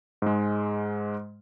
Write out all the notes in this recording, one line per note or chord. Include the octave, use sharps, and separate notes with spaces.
G#2 G#3